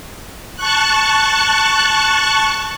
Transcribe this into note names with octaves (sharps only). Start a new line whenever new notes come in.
A5 C#6 F#6